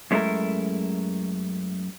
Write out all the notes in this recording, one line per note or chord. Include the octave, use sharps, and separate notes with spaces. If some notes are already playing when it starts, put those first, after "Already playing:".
F#2 G#3 A3 C#4 E4 A#4